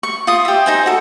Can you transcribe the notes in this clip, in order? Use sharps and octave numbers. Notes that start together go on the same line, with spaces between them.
C#6
F4 D#6
G4 E5
D#4 C5 G#5
F#4 A4